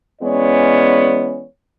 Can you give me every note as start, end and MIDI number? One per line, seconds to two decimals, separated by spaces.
0.22 1.43 52
0.22 1.43 56
0.22 1.43 59
0.22 1.43 61
0.22 1.43 73
0.22 1.43 74